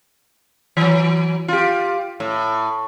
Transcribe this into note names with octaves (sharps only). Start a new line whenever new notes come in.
E3 F#3
F4 G4
A2